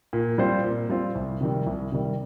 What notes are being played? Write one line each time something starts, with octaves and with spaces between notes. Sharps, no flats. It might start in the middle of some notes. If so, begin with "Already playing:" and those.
A#2
G3 C4 F4 C5
A#2
G3 C4 F4 C5
C2
C3 D#3 G3
C2
C3 D#3 G3